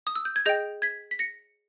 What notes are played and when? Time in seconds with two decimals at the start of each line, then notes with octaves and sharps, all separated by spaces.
0.07 D#6
0.16 E6
0.25 G6
0.36 G#6
0.45 G#4 D#5 G5 G6 A#6
0.82 G#6 B6
1.11 B6
1.19 A#6 C#7